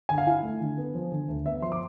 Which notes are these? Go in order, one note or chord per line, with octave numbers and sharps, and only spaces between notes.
D3 G#5
F5
E4 G#5
A3
D3
B3
F3
D3
D2
B3 E5
F3 C6
D6